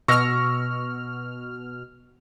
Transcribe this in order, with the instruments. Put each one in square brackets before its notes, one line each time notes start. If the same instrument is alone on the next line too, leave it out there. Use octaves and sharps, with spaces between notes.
[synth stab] B2 F6 [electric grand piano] C#6 E6 A#6